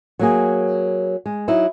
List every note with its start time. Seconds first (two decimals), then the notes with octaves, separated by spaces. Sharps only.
0.19 F#3 A#3 G#4
1.26 G#3
1.48 F#3 D#4 E4